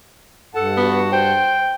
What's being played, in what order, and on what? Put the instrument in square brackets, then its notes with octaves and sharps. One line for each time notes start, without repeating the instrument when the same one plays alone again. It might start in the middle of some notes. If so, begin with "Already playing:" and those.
[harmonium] G2 F#5 A5 [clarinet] A4
[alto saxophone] B3 [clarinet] F#4
[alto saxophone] C5 [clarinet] G5